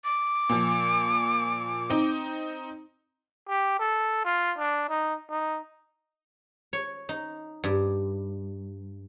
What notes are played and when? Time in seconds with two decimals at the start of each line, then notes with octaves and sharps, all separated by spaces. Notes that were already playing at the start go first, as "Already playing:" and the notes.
0.04 D6
0.49 A#2 F3
1.90 C4 D#4
3.48 G4
3.79 A4
4.25 F4
4.58 D4
4.90 D#4
5.30 D#4
6.73 C#5
7.09 D#4
7.64 G2